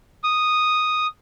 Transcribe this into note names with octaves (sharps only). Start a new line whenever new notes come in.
D#6